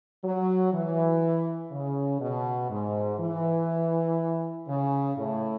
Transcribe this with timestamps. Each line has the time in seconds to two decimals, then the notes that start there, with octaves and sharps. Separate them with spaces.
0.23 F#3
0.73 E3
1.72 C#3
2.21 B2
2.70 G#2
3.19 E3
4.67 C#3
5.17 A2